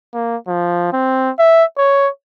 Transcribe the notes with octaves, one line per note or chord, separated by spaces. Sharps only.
A#3
F3
C4
E5
C#5